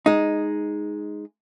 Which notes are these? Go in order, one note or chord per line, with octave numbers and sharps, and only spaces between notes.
G#3 D#4